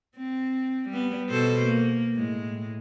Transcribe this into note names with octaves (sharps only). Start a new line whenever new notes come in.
C4
G3 B3
B2 A4 C5
A#3
A2 G#3